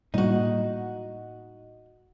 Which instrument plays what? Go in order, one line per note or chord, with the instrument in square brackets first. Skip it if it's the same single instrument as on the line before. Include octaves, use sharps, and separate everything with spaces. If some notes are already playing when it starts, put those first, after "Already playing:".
[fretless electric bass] A2 G3 A#3 [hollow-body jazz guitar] D#4 F#4